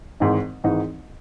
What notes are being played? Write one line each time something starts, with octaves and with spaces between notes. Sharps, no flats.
G#1 G#2 E3 G#3 D#4
G#1 G#2 E3 G#3 D#4